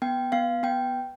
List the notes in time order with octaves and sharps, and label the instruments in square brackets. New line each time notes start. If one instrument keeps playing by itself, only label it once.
[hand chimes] B3 G5
B3 F5
B3 G5